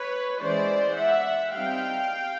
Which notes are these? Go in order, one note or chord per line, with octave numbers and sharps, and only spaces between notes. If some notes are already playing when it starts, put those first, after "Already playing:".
Already playing: B4 C#5
E3 G#3 C#4 C5 D5
E5 F#5
G3 C4 D#4 F5 G5